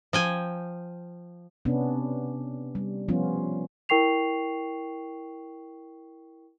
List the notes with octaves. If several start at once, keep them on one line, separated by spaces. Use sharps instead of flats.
F3 G5 G#5
C3 B3 C#4 D4
G3
F3 G3 B3 C#4 F4
E4 A#4 G5 C#6 C7 F7